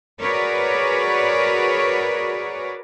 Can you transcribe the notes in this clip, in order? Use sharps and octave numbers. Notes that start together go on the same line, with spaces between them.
F#4 G#4 A#4 B4 C#5 D5